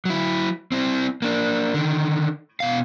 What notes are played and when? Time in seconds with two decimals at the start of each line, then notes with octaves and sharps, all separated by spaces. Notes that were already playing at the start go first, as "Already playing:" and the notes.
0.05 F#3 E4
0.72 C4 E4
1.22 A#3 D4
1.74 D3 D#3
2.60 B2 F5